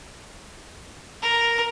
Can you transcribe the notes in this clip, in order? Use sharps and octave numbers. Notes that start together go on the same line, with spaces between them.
A#4